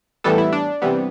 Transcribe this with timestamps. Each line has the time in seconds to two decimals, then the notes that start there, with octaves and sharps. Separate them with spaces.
0.24 A2 E3 G3 B3 A4
0.38 E4
0.52 D4
0.82 C3 E3 G3 B3